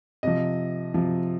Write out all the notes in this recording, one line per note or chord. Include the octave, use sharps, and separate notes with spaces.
C3 F3 D#5
C3 F3